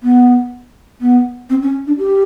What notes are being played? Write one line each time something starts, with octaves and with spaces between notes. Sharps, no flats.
B3
B3
C4
C#4
D4
G4